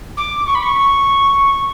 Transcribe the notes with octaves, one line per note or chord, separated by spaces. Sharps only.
D6
C#6
B5
C#6